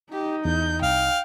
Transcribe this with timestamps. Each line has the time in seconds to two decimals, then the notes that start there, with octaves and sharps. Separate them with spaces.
0.13 D#4 G4
0.45 E2 G6
0.82 C2 F5 G5